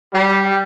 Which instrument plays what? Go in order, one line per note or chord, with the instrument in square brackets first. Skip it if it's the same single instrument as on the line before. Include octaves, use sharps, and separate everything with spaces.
[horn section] G3